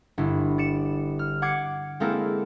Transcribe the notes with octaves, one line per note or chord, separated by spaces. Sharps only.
G1 E4
D5 C#7 E7
F6
F#5 D6 G#6 C7 C#7
G#3 A#3 C4 E4 A4 A#4